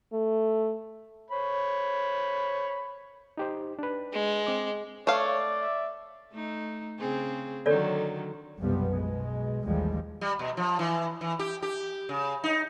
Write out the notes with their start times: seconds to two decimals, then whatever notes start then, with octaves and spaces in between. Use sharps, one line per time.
0.13 A3
1.31 C5 C#5 B5
3.37 D#4 G4 C5
3.79 D4 B4
4.13 G#3
4.47 C4 D6
5.07 A3 C#5 D5 F5
5.58 E5
6.33 A3 D#4
6.99 C#3 C4 G#4
7.66 D3 D#3 F#3 A4 C#5 D5
8.60 B1 F#2 C3 F3 G3 B3
8.93 B2 G#3
9.65 A1 D#2 F3 G3 G#3
10.21 G3
10.39 B2
10.57 F3
10.79 E3
11.21 E3
11.39 G4
11.62 G4
12.09 C#3
12.44 D#4